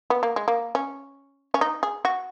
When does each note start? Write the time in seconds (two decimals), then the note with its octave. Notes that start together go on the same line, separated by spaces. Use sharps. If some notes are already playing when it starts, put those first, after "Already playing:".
0.10 B3
0.23 A#3
0.36 G#3
0.48 A#3
0.75 C#4
1.54 C#4
1.61 D#4
1.83 G#4
2.05 F#4